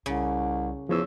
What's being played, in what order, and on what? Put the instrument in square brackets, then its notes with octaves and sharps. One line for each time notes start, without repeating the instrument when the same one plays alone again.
[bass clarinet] C2 [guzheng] C#3
[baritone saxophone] E2 [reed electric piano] F3 C#5 E6